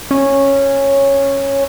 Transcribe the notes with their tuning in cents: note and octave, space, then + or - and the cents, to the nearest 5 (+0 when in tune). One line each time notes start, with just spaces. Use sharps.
C#4 -10